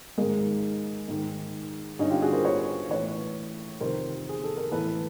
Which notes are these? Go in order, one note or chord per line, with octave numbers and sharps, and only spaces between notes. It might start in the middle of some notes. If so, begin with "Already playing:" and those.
G#2 D#3 G#3 A#3
G#2 D#3
G2 D3 C#4 D#4
F4 G4
F#4 G#4
A#4 C5
B4 C#5
A2 E3 B4 C#5
F2 C3 D#3 A#4 C5
G#4
A4
A#4
A2 E3 A4 B4